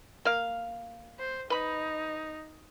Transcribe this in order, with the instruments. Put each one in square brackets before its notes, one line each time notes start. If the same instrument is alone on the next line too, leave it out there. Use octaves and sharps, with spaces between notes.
[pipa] A#3 F5
[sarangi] C5
[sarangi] D#4 [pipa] B4 B5